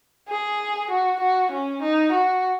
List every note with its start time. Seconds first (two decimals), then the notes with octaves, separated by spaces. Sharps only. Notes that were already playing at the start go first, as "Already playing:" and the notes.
0.28 G#4
0.91 F#4
1.20 F#4
1.51 C#4
1.82 D#4
2.12 F#4